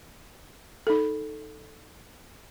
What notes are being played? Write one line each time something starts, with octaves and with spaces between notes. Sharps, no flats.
D#4 A4